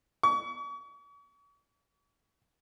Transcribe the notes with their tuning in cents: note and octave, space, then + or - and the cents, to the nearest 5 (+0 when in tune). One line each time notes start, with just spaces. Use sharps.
C#6 +40